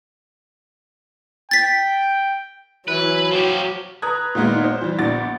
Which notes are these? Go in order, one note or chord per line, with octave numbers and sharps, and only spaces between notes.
G5 A6 B6
E3 F#3 B4
F3 F#4 G4
B4 A#5 D#6 F#6 G#6
A#2 D#3 G#3 B3 D#4
C5
E3 G3
A#1 B3 D4 F#4 A6